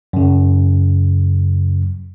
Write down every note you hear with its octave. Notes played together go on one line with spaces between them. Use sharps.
F#2 C#3